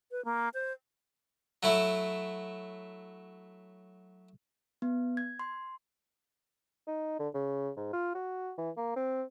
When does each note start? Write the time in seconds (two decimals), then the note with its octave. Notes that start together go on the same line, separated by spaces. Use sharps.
0.11 B4
0.25 A#3
0.54 C5
1.63 F#3 A3 E4
4.82 B3
5.17 G#6
5.39 C6
6.87 D#4
7.19 D3
7.34 C#3
7.77 G#2
7.93 F4
8.15 F#4
8.58 E3
8.77 A#3
8.96 C4